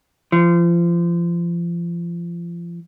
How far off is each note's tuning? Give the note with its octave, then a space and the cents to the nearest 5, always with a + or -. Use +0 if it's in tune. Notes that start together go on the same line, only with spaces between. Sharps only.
F3 -30